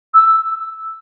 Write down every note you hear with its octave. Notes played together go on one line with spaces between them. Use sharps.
E6